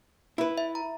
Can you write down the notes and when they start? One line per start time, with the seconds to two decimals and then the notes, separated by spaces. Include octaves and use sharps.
0.38 E4 B4
0.58 E5
0.75 A#5